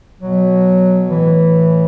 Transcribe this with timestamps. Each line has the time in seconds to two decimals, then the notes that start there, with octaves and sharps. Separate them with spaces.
0.21 B2 F#3
1.09 A2 E3